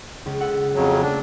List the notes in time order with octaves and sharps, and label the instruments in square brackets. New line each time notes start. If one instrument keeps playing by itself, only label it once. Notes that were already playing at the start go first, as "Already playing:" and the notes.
[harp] C#2
A4 F#5 E6
[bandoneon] F2 C#3 F#3
[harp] A3 A#3 [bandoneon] D4